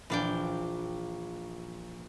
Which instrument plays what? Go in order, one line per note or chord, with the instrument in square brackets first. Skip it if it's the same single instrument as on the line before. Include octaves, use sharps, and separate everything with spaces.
[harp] A#1 F5 [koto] E3 D4 G5